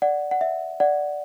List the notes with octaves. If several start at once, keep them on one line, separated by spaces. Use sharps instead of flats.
D5 F#5
F#5
E5
D5 F#5